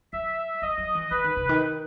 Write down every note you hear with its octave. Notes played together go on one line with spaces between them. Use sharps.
F#3 E5
F#3 D#5
F#3
E3
E3 B4
D#3
C3
D#3